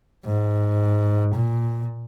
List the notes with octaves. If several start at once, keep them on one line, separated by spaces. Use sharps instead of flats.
G#2
A#2